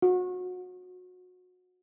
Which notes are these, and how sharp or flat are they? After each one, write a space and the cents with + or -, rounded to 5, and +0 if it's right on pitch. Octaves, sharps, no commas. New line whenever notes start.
F#4 -30